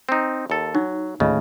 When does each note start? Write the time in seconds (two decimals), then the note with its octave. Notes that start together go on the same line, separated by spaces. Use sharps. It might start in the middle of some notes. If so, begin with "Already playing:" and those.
0.09 C4 D#4
0.50 D#2 A4
0.75 F#3 D#4
1.20 D1 D#2 A2 C#3 F4 D#5